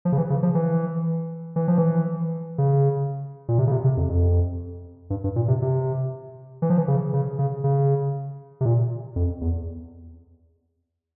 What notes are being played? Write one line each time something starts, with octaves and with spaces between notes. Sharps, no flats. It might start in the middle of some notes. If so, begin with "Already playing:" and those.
F3
C#3
E3
C#3
F3
E3
E3
F3
E3
C#3
A#2
C3
C#3
C3
C3
F2
F2
G2
G2
A#2
C3
C3
E3
F3
E3
C#3
C#3
C#3
C#3
C3
A#2
F2
E2